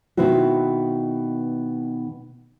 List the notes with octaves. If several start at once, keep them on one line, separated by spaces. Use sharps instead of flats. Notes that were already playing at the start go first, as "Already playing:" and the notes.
B2 D#3 B3 C4 E4 F#4